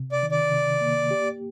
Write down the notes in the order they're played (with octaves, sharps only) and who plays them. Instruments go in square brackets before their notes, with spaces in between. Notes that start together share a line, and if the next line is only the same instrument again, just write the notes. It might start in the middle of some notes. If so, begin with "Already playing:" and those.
Already playing: [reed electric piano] C3
[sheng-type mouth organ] D5
[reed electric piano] D#3
[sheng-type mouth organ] D5
[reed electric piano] C3
A#3
G4